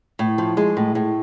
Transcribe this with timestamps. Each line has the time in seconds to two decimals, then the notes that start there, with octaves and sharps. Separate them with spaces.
0.19 A2
0.38 F3
0.57 G#3
0.77 A2
0.95 A2